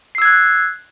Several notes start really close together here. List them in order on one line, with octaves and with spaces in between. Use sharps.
C7 E6 G#6 F#6